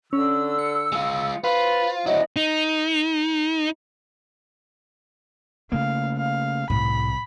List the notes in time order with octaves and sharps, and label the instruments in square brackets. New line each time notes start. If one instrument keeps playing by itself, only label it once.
[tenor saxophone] D3 [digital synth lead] C#4 [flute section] E6
[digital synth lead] C#7
[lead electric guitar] G#3 F4
[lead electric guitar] F4 [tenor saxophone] B4 [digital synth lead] C5
[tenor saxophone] F#3 [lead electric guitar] D4 E4 [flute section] D#5
[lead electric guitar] D#4
[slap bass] C#3 A3 A#3 [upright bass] E4 [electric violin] F5
[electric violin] F5
[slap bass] C2 [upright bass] A2 [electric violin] B5